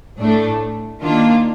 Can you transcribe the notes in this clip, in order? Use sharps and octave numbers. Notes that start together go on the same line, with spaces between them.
A2 A3 D4
D#3 A#3 D4 F4